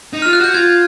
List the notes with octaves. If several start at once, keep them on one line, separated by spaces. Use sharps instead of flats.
D#4
F4 F6
F#6
F#4 G6
F4 G#6